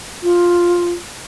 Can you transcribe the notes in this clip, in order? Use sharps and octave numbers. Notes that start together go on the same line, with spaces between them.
F4